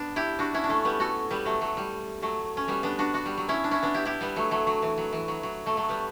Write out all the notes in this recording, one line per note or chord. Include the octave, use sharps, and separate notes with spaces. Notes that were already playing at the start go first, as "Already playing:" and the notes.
Already playing: B3 D4
E4 G4
D4 F#4
C#4 E4
D4
A3 C#4
G3 B3
F#4 A4
G3 B3
F#3 A3
F#3 A3
G3
F#3 A3
C#4
G3 B3
B3 D4
D4 F#4
D4 F#4
G3
F#3
C#4 E4
D4
C#4 E4
B3 D4
E4 G4
E4 G4
G3 B3
F#3 A3
F#3 A3
F#3
E3
F#3
E3
F#3
F#3
F#3 A3
F#3 A3
G3 B3